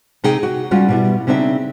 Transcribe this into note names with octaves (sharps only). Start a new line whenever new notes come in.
C3 D#4 G#4 G5
F#4
G3 C#4 F4 F#4
B2 G3 E4
C#3 C4 D4 D#4 E5